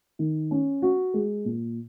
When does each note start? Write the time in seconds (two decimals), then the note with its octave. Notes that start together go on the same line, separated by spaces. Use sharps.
0.19 D#3
0.51 C#4
0.82 F#4
1.14 G#3
1.45 A#2